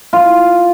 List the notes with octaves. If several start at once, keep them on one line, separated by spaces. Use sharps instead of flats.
F4